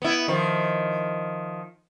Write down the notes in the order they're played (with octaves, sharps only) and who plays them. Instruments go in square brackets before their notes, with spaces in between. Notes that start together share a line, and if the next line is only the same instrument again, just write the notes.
[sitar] B3 E4
D#3 F3